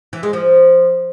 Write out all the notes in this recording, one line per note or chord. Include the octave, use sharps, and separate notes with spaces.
E3
G#3
F3